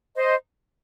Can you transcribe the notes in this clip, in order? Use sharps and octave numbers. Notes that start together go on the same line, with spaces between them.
C5 D#5